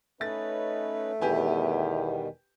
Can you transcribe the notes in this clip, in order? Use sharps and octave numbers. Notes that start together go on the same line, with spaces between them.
A3 C#4 D#4 B4 A6
E2 B2 D#3 G3 G4 B4 G#5